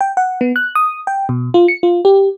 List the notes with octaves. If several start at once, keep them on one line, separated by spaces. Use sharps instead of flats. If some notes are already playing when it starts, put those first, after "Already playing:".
G5
F#5
B3
F#6
D#6
G5
B2
F4
C#7
F4
G4